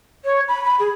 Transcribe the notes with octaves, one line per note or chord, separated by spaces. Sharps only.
C#5
B5
B5
G#4